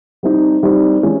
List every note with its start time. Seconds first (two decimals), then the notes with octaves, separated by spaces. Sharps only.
0.23 G3 C4 D#4
0.63 G3 C4 D#4
1.03 E3 G#3 C#4